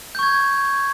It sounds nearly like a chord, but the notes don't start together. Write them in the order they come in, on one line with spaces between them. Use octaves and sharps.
G6 C#6 G#6